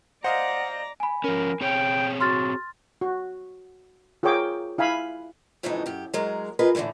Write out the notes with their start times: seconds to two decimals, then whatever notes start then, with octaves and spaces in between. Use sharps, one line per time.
0.24 C5 D5 D#5 F5 F#5 A#5
1.00 G#5 B5
1.24 F3 C#4 A#4
1.61 C4 G#4 C#5 G5
2.21 F#4 C6 F6 A6
3.01 F#4
4.23 F4 G#4 A#4 C#5 G5 D6
4.78 E4 F5 G#5 B5
5.63 F2 A2 C#3 E3 G#3 D#4
5.86 F#2 G4
6.14 F#3 G#3 A#4
6.59 F4 G#4 A#4 B4 D#5
6.75 A2 D3 E3 G#3 A3